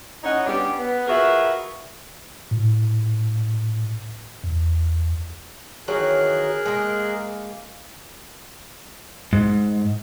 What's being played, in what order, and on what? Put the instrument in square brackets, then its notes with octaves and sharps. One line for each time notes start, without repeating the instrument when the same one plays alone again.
[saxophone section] A2 C#4 D#4 C#5 D#5 F#5
G3 B3 C#4 D4 G4
B3
F4 F#4 G#4 A#4 B4 E5
[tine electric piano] A2
E2
[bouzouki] D#3 E3 F#3 [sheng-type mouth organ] G#4 A#4 F#6
[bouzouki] G#3 A#3
[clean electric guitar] G#2